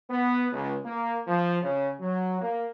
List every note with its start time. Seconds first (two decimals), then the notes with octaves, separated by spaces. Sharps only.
0.10 B3
0.53 C#2
0.85 A#3
1.27 F3
1.63 C#3
2.00 F#3
2.41 A#3